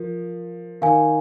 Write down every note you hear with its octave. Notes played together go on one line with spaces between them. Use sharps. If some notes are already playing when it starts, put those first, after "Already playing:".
Already playing: F3 A#4
D#3 A#4 F5 G#5